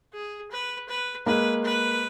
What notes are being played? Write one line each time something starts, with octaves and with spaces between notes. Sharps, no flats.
G#4
B4
B4
G#3 A#3 B4
B4